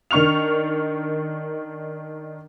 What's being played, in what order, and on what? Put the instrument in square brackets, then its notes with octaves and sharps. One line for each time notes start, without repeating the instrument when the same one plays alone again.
[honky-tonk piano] D#3 D4 C#6 F6 F7